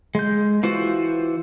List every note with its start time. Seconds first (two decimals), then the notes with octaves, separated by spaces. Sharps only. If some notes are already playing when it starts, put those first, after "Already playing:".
0.15 G#3 G6
0.63 E3 F4 F#4 B4 C5